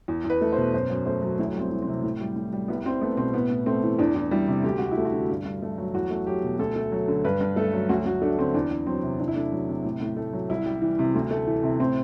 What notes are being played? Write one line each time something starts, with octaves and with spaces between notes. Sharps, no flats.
E2
E2
B4
A3
C5
B2
F#2 C5
F#2
A3 C5
F#3
D2 E4
G3 C4
E3
C4
C3
A2
G3
A2
G3
C2 B3
C2 C4
A3 B3
B2 C4
A2 B3
A2
A3 C4
E3
E2 D4
E2
G3 E4
C3
D2 G4
D2 F#4
E4
A3
F#4
D3
G2
G2
A3
F#3
E2 F#4
A3
F#3 G4
B2
D2 A4
A3
F#3
D3
G2 B4
G2
A3 A4
F#3
D2 F#4
D2 F#4
A3 D4
D3 C4
E2 D4
E2
F#3 C4
C3
E2 D4
E4
A3 D4
F#3
C3
A2
A2
A3
F#3
C2 E4
G3
E3
C3
D2
A3
E3
C3
A2 C4